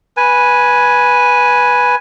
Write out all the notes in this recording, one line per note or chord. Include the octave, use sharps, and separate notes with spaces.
B4 G#5